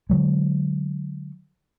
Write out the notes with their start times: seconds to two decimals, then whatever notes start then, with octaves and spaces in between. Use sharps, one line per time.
0.10 D3 F#3 G#3